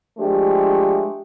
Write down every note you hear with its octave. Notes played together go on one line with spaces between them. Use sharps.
F3 G#3 A3 D4 G4